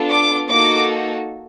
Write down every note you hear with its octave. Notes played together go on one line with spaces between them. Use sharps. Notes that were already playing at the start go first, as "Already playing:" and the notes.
Already playing: B3 D4 F4 A4
D6
A#3 D#4 F#4 A4 D6